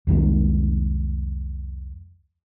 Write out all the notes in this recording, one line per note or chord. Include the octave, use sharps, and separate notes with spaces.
C2 F2 D#3 G#3